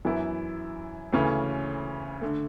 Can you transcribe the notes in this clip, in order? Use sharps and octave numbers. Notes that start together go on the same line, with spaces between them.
F#2 E3 B3 E4
D2 C#3 E3 A3 C#4
D3 A3